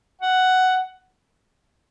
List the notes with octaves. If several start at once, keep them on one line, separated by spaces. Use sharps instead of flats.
F#5